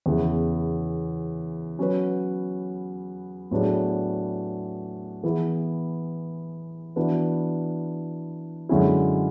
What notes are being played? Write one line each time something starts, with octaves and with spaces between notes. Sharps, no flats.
E2 C#3 E3
F#3 C#4 F#4 B4
A2 F#3 B3 D4 G#4
E3 B3 E4 G#4
E3 B3 D4 F#4 B4
F#2 D3 G#3 C#4 E4